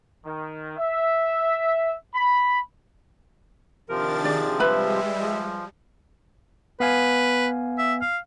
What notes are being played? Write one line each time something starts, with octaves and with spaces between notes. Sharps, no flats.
D#3
E5
B5
C3 D#3 F3 D4 A#4 A6
G#4 D5
G3 G#3 B4 E5 B5
F3
B3 B4 F5 G#5
E5
F5